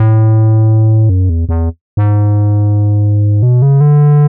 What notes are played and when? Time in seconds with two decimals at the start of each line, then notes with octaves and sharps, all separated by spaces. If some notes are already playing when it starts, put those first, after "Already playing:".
Already playing: A2
1.09 F#2
1.30 E2
1.49 E2
1.97 G#2
3.43 B2
3.62 C#3
3.81 D3